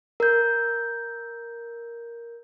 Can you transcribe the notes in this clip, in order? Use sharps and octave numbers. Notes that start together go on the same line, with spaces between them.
A#4 G6